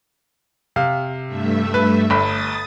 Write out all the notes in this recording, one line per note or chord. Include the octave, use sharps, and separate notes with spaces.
C3 F5
G2 A3 E5
B4
G1 B5 D#6 A6